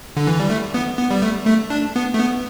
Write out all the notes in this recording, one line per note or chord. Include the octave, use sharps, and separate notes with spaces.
D3
E3
G3
A3
B3
B3
G3
A3
A3
D4
B3
A3
B3